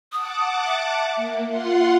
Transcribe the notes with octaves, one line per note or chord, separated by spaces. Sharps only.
F#5 A5 D6 D#6
E5
A#3
F4 F#5 C6